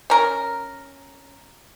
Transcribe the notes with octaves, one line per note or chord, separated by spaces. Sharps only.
C#4 A#4